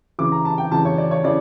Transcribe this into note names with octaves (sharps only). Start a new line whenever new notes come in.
C#3 E3 D6
A#5
A5
G5
C#3 E3 A5
C#5
D5
C#5
C#3 E3 D5